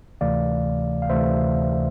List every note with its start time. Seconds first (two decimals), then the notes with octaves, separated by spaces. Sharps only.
0.21 D2 C3 E3 A3 D5 F5
1.02 F5
1.10 D2 C3 E3 A3 C5 E5